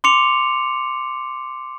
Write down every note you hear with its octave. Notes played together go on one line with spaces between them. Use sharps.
C6 D6 C#7 F7